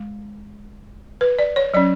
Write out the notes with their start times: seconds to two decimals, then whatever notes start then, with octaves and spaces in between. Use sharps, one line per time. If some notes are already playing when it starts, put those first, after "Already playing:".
Already playing: G#3
1.21 B4
1.39 D5
1.56 C#5
1.74 F#3 C#4 D5